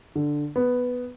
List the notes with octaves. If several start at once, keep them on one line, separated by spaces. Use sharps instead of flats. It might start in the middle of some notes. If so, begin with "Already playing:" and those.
D3
B3